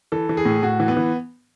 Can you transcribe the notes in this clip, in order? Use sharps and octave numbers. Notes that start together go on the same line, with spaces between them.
E3 A4
E3
G#4
A2
A2 F#4
E3
B3
E3